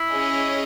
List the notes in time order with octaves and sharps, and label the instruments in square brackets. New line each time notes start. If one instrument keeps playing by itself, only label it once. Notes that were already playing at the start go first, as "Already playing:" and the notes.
Already playing: [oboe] E4
[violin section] C#4 G#4 D#5